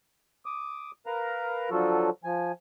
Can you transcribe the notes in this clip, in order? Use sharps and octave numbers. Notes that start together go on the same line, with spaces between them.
D6 D#6
A#4 B4 F5 A#5
D3 F3 F#3 F4 F#4 A4
F3 G#5